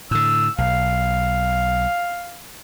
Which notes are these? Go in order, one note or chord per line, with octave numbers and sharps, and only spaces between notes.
A2 D3 E6
B1 F5